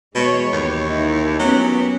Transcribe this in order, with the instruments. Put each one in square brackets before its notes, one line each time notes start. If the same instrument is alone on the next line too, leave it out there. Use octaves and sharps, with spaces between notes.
[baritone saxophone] B2 [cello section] E3 G#3 C#5
[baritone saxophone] D#2
[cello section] D#4 E4
[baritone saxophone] F#3 [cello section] B3 C#4 G4